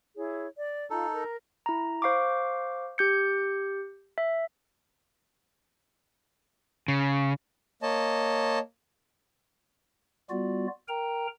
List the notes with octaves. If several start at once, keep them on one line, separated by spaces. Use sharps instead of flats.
E4 G#4 C#5
D5
D#4 F4 A4
A#4 A#5
E4 A#5
C5 F5 C#6 D6
G4 G6 C#7
E5
C#3
A#3 C#5 D#5 A5
G3 B3 F4 F#4 D5
A#4 G5 A#5